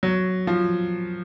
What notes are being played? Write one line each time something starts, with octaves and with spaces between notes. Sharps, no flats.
F#3
F3